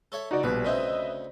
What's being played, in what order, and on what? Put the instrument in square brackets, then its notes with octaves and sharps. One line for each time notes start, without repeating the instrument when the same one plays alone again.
[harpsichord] A4 C#5 E5
[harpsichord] C#2 [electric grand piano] D#4 F#4 D5
[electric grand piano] A#1 B2 G3 [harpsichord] B4
[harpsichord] D2 C#3 C4 [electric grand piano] B4 D#5 E5